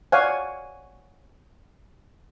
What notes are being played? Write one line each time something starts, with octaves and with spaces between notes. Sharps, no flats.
C#5 D5 F5 F#5 G#5